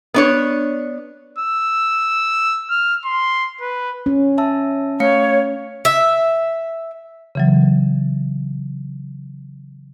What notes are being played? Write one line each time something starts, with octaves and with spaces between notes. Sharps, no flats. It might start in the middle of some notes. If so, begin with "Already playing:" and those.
B3 D4 C#5
E6
F6
C6
B4
C#4
E5 A5 E6
A3 C#5 F5 C#7
E5
C#3 E3 F#3